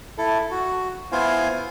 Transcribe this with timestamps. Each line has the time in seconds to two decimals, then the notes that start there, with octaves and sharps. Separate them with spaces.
0.18 E4 A4
0.51 F#4
1.12 B3 E4 F4 C5 F5 G#5